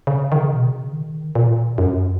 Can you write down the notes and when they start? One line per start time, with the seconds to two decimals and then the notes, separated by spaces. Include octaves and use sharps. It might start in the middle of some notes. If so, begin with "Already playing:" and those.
0.07 C#3
0.32 D#3
0.36 C#3
0.53 B2
0.65 C#3
0.93 D#3
1.35 A#2
1.78 F#2